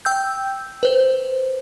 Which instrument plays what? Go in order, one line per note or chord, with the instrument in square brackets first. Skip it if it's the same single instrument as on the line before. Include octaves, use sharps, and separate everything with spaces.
[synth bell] G5 E6 G6
B4 C5